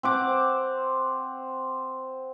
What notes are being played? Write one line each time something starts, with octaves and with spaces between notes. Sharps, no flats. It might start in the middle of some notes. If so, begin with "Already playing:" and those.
C4 F#5 D6